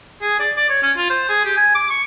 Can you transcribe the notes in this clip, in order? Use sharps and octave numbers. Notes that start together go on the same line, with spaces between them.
G#4
D5
D5
C#5
C#4
F4
C5
G#4
G4
G#5
D6
C#6